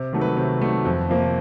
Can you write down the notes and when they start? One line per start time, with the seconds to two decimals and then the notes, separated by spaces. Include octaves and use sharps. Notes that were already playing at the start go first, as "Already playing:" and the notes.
Already playing: C3
0.13 D#3 F#3 A3
0.21 B4
0.37 C3
0.61 D#3 F#3 A3
0.85 F2
1.09 C3 F3 A#3